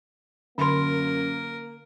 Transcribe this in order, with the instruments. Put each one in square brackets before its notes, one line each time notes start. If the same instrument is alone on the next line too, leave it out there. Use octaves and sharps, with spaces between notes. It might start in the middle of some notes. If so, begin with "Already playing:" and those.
[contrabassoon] F#2 [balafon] D3 C6 [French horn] A#3 [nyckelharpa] A#4